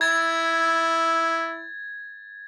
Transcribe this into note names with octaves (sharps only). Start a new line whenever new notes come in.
E4 G#6 A6